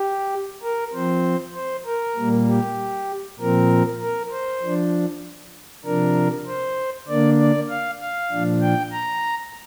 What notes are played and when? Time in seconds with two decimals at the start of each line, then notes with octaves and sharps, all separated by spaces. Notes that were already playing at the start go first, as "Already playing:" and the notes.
Already playing: G4
0.62 A#4
0.93 F3 C4 C5
1.55 C5
1.85 A#4
2.16 A#2 G3 A#3
2.47 G4
3.39 A#2 F3 C4 A#4
4.01 A#4
4.31 C5
4.63 F3 D4
5.85 C3 F3 D4 A#4
6.47 C5
7.08 D3 A#3 D4 D5
7.39 D5
7.69 F5
8.00 F5
8.31 A#2 F3 D4
8.61 G5
8.92 A#5